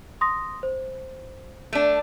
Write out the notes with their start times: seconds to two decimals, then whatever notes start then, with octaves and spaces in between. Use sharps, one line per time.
0.21 C6 D#6 A#6
0.63 C5
1.73 A3 D4